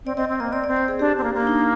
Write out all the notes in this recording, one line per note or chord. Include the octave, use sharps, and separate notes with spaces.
C4 D5
C4 D#5
C4 D5
A#3 D#5
C4 D5
C4 D5
C5
G#4
D4 G4
C4
A#3
A#3
D4
D#4